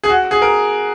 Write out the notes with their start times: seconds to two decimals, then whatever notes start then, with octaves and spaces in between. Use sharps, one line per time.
0.04 G#4
0.09 F#4
0.31 G#4
0.42 A#4